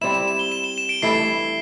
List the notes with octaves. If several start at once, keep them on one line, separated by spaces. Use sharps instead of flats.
G3 C4 E4 E7
E7
E7
G7
E7
G7
E7
D7
G2 E3 A3 E4 C7